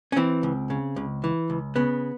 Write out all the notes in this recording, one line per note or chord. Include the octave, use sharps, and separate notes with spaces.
C#4
E3 C4
C#2
C#3
C#2
E3
C#2
C#3 B3